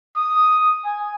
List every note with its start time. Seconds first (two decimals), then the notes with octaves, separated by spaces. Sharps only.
0.16 D#6
0.85 G#5